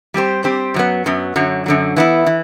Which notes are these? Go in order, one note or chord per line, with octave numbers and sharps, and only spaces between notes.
G3 C4 G4 C5
G3 C4 G4 C5
F#2 F#3 B3
F#2 F#3 B3
F#2 D3 F#3
F#2 D3 F#3
E3 B3 E4
E3